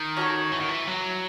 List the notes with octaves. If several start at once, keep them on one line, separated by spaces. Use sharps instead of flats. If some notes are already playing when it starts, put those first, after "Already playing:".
Already playing: D#3
C#4 F#4 A4 C#5
E3
D#3
E3
F#3